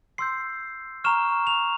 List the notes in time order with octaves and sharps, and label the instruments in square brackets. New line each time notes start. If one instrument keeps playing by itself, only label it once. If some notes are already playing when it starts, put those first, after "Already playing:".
[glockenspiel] C6 E6 G6 C7
A#5 C#6 F6 E7
F7